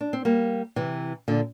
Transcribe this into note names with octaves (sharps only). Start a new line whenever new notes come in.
D4
C4
G3 A#3
C3 E3
A#2 D3